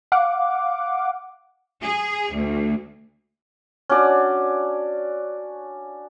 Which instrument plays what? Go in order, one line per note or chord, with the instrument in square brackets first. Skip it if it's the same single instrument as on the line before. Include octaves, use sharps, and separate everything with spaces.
[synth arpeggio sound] F5 F#5 D6
[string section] G#4
D2
[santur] C#4 D4 F#4 D5